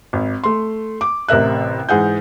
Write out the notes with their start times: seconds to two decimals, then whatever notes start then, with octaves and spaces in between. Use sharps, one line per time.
0.13 G#1
0.44 A3 C6
1.01 D6
1.29 A1 C3 A#4 E5 F#6
1.89 G#2 E3 G#4 F#5 G6